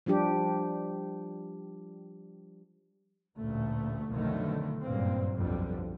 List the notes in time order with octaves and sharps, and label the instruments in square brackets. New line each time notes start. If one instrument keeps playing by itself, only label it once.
[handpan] F3 G3 D4 G4
[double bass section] A1 D2 A#2 A3
B1 F2 D3 D#3 A3
F#1 G2 A#2 A#3 C4
B1 F2 D3 G3